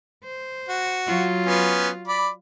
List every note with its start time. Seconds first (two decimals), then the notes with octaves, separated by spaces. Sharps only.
0.24 C5
0.69 F#4
1.07 F#3 F4
1.46 B3 C#4
2.08 D5 B5